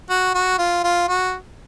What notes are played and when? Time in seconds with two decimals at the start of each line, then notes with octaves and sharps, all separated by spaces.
0.10 F#4
0.35 F#4
0.59 F4
0.84 F4
1.08 F#4